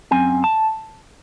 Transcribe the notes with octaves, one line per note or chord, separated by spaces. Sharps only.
F#2 C4 G#5
A5